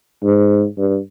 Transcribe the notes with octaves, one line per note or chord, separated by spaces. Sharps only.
G#2
G2